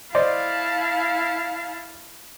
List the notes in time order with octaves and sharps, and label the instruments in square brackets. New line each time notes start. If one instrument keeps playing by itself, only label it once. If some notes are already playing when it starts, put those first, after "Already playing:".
[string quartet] E4 F5 A5 [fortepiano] C5 D5 D#5